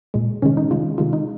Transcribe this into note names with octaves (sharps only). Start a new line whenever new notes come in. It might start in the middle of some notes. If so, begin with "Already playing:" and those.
A#2 G#3
C3 D#3 G#3 C#4
D#4
C3 D#3 G#3 F4
C3 D#3 G#3 F4
D#4